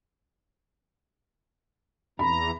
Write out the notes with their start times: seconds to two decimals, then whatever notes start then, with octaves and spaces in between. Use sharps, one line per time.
2.19 E2 E3 A#5 B5